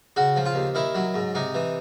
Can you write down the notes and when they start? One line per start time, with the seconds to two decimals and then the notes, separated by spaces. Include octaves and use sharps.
0.16 C#3 F#4
0.36 F3
0.46 F4
0.55 D#2
0.75 D#3 E4
0.95 F#3
1.14 G#2
1.35 C3 D#4
1.55 E3